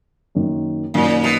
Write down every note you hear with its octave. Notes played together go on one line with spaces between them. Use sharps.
F#2 D#3 A#3
F#2 A#2 D#3 A#3
B2